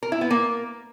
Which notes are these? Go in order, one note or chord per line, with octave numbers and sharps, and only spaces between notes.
A#4
E4
B3
A#3